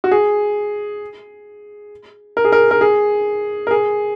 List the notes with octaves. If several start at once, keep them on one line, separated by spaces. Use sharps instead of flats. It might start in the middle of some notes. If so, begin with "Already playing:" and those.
F#4
G#4
A#4
G#4
A#4
A#4
G#4
A#4
G#4